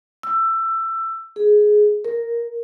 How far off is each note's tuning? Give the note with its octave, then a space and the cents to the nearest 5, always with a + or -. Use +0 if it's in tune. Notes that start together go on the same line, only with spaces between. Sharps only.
E6 +20
G#4 +10
A#4 +0